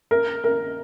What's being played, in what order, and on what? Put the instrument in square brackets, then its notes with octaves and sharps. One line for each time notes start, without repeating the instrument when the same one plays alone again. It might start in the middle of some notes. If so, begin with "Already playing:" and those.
[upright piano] A#4
A#4